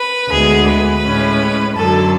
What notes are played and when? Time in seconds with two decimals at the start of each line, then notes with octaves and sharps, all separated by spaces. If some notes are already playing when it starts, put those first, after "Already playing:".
Already playing: B4
0.30 D2 D3 G#3 B3 G#4
0.67 B4
1.03 A2 G#3 C#4
1.75 F#2 D3 F#3 A4